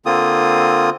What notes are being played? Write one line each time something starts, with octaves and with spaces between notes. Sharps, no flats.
D3 A#3 C4 F4 D#6